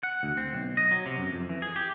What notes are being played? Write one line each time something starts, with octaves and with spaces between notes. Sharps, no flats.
F#5
D2
C4
B1
D#5
F#3
C3
F#2
F2
E3
G#4
G4